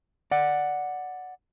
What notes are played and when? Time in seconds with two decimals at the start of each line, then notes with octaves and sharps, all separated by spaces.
0.31 D5 F#5